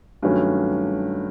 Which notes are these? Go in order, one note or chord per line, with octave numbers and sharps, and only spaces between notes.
G2 D#3 F#3 A3 C#4